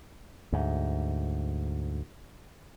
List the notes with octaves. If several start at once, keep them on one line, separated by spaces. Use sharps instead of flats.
D2 G#2